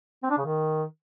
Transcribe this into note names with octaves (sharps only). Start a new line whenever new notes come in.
C4
D4
C#3
D#3